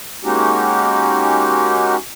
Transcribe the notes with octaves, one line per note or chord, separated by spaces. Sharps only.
G#3 A#3 C#4 D#4 F#4 G4